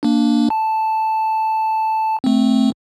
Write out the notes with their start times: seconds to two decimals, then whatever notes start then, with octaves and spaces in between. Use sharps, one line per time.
0.03 A#3 D4
0.50 A5
2.24 A3 C4